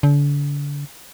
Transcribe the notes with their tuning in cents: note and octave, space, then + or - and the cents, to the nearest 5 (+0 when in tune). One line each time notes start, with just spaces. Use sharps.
D3 -35